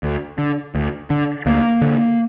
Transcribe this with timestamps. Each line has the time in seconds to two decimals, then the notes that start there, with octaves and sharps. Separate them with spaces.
0.03 D2
0.38 D3
0.75 D2
1.10 D3
1.46 D2 A#3
1.81 D3